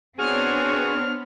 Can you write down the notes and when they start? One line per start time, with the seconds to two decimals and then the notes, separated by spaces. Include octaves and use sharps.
0.19 B3 C4 D4 F#4 G#4 C#5 F6